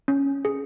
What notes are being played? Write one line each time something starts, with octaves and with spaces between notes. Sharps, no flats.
C#4
G#4